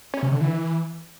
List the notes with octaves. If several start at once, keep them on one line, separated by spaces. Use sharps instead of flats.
C#4
C3
D3
E3